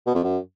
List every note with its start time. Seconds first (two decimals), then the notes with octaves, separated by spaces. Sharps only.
0.06 B2
0.15 F2
0.23 F#2